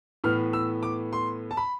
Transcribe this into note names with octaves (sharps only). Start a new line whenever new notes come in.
A2 E3 B3 F6
E6
D6
C6
A5
B5